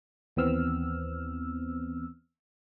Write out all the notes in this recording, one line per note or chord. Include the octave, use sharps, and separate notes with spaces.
D#2 E3 B3 C4 E6 F6